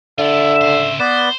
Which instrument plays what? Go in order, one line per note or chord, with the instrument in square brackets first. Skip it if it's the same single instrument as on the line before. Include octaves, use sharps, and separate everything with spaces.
[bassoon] D3 [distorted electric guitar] E4 F4 [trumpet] E5
[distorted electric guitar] C#3 C5
[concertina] B3 B4 D5 [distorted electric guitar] C5